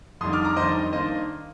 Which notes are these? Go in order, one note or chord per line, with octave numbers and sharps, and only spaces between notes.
F2 D#3 G3 D4 C6 D#6
D6 F6
A#5 D6
F2 D#3 G3 D4 C5 D#5
D#3 A#3 D4 C5 D#5